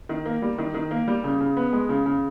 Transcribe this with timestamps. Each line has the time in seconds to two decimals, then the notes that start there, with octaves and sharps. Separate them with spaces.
0.09 D#3
0.26 A#3
0.42 G3
0.58 D#3
0.74 D#3
0.91 A#3
1.08 G3
1.24 C#3
1.41 C#3
1.57 B3
1.73 G#3
1.89 C#3
2.06 C#3